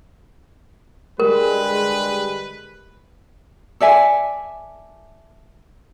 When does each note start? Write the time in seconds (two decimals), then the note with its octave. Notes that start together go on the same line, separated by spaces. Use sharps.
1.20 D3 G3 G#3 A#4 B4
3.80 A4 D5 E5 G#5